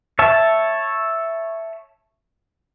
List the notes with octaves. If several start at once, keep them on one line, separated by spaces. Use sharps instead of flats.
C#5 E5 A5